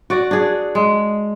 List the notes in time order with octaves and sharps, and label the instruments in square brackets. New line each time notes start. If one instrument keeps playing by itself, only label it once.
[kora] F#4 D5
D4 G#4
G#3